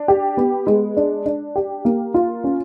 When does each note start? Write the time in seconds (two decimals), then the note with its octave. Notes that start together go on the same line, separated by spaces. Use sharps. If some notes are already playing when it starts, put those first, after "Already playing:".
Already playing: D4
0.08 G4
0.37 B3
0.67 G#3
0.97 D4
1.26 D4
1.56 G4
1.85 A#3
2.14 F4
2.44 C#4